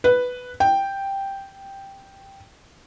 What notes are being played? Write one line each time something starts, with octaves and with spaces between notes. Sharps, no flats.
B4
G5